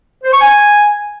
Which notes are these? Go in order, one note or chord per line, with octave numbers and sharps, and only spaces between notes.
C5
C#6
G#5